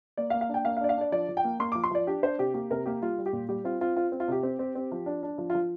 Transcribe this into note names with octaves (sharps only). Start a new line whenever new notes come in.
A#3 D5
F5
A#3
F5
D4
G5
A#3 F5
F5
D4 D5
F5
D4 D5
F3 D5
F3
G5
A#3
A#3 C6
D6
F3
C6
F3 D5
D4 G4
D4 C5
C3 G4
A#3 G4
C3 A#4
A#3 G4
G3 F4
G3
G4
A#2
G3 G4
C4 F4
C4 F4
C4 F4
C4
F4
C3 G4
C4
C4
C4
F3
D4
D4
F3
F4
F3